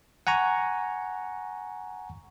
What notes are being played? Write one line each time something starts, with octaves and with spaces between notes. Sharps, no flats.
F#5 G#5 A#5 C#6